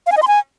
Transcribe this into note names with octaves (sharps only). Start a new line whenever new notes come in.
F5
G#5
D#5
C6
G#5